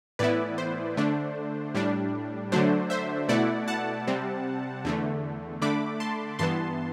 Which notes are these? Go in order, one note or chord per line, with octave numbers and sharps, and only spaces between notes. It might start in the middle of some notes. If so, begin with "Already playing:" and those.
A2 E3 B3 E4 B4 D5
C5
D3 A3 D4
A2 G3 D4
D3 F#3 A3 D4 C5
C5 E5
B2 A3 E4 D5 F#5
F#5 A5
C3 G3 C4
E2 D3 A3
D3 A3 D4 B5 D6
A5 C6
G2 E3 B3 A5 C6